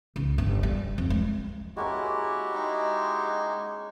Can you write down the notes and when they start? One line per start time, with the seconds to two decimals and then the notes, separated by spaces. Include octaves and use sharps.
0.16 C#2
0.38 G1
0.63 G3
0.98 F2
1.10 G#3
1.77 G#3 A#3 C#4 E4 F#4 G4
2.54 G#3 D#4 F5